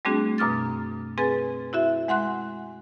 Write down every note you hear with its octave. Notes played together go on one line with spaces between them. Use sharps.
G3 A3 C4 D4 F#4 G#4
F#2 B2 D6 F6 A6
C4 G#4 B4 G#5 A6
E4 F#4 E5
G#3 F#5 C6 F#6